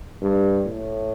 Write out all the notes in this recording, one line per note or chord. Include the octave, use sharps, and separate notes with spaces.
G2
A2